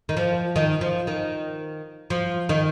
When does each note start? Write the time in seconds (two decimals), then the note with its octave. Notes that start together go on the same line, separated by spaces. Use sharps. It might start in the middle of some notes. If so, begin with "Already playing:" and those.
0.09 D#3
0.17 F3
0.56 D#3
0.81 F3
1.07 D#3
2.10 F3
2.49 D#3